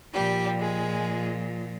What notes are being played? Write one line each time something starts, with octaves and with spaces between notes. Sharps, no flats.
A#2 F3 G3 G4
G#3 G#4